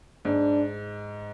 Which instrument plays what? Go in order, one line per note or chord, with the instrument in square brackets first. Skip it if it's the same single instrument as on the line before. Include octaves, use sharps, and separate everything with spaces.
[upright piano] G#2 [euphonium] D4